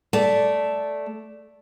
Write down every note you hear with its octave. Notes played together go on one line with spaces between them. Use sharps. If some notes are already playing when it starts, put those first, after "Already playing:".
A3 D5